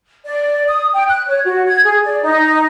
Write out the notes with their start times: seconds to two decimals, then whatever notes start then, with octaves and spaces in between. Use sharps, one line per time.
0.24 D5
0.68 D#6
0.93 G5
1.09 F#6
1.27 C#5
1.45 F#4
1.67 G#6
1.84 G#4
2.04 D5
2.22 D#4